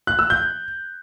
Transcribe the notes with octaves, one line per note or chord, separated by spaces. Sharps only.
F#6
E6
G6